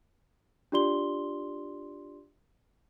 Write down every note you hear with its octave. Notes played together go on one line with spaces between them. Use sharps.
D4 F4 G4 D5 C6 G7